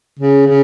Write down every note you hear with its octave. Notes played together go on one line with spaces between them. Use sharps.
C#3
C#3